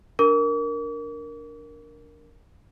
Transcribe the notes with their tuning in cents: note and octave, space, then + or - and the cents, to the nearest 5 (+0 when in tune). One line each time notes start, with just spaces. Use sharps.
D4 +0 A#4 +0 D6 -45